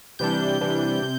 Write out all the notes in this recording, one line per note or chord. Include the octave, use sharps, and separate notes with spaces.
C3 E3 G3 D4 G6
C3 E3 G3 D4
C3